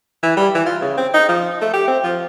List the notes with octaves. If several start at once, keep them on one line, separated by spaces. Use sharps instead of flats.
E3
G3
E3
F4
C#3
C4
D#4
F3
A3
G4
C4
F3